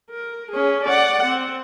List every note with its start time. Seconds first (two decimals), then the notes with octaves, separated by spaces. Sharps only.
0.10 A#4
0.52 C#4 G#4
0.84 D5 F#5
1.25 C4